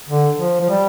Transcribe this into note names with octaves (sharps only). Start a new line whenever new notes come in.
D3
F3
F3
G3